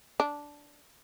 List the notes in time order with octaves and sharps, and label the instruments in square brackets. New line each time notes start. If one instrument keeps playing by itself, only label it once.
[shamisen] D4